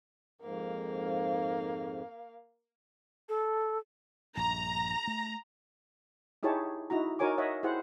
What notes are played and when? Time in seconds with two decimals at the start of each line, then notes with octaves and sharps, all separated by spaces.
0.41 F2 G#2 A#3 F5
3.29 A4
4.37 A#1 G2 A#5
5.07 A3
6.43 D#4 E4 G4 G#4 C#5 A5
6.90 D#4 E4 F#4 A#5
7.19 D#4 F#4 A#4 C#5 G#5 D6
7.38 C#5 D#5 E5 F#5
7.63 E4 G4 G#4 C5 F#5